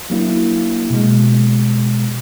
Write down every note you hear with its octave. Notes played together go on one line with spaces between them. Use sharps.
F#3 A#3 D4 E4
B2 G#3